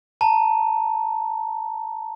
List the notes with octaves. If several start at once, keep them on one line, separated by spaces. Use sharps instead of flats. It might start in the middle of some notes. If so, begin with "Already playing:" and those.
A5 A#5